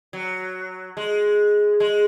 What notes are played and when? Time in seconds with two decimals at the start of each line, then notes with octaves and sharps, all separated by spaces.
0.13 F#3
0.97 G#3
1.80 G#3